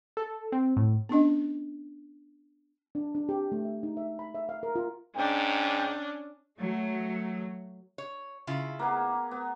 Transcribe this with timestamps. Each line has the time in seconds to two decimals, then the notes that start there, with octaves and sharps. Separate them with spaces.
0.17 A4
0.52 C4
0.77 A2
1.09 B3 C#4 D4 D#5
2.95 D4
3.15 D4
3.29 G4
3.52 A3
3.65 E5
3.83 D#4
3.97 E5
4.19 B5
4.35 E5
4.49 F5
4.63 A#4
4.76 F4
5.16 G#2 C#4 D4 G5
6.57 F#3 A3
7.98 C#5
8.47 C#3 E4 F4
8.79 A#3 B3 G#4
9.31 B3